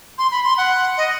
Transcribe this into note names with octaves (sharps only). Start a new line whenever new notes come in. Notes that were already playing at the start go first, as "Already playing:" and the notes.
C6
B5
C6
F#5
D#5